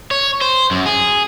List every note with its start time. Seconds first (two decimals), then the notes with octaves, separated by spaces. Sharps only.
0.11 C#5
0.41 C5
0.71 F#2
0.86 G#4